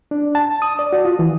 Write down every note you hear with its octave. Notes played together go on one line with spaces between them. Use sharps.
D4
A5
D#6
D5
F#4
F4
E3